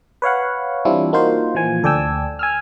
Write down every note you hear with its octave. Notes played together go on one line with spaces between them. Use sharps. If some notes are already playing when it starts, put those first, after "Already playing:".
B4 C#5 F5 F#5
E3 G3 C4 D4 E4 F4
A#3 D#4 F4 F#4 C5
A#2 E3 F3 G#5
D2 A4 D5 G5 G#5 E6
G#5 E6 F6